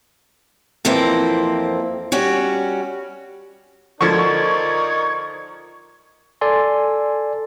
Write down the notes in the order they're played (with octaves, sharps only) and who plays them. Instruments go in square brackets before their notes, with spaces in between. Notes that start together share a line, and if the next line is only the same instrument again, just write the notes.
[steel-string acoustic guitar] F2 E3 F3 A#3 C4
G3 C#4 F#4
[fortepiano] D3 F3 [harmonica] D#4 A#4 D5 [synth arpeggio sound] C#6 G#6
[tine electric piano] A4 D5 G#5 C6